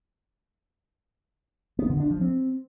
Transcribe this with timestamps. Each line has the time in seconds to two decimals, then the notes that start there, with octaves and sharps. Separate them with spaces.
1.79 B3
1.89 D3
2.00 D4
2.11 F3
2.21 C4